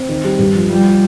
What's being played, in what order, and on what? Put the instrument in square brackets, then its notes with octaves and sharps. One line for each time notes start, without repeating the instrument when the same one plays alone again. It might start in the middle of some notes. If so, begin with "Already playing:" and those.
Already playing: [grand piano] C4
D#3
G3
G2
F3
[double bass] G3 [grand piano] F4
[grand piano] F4